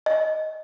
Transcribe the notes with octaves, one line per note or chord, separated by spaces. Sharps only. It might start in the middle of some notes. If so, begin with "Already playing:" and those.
D#5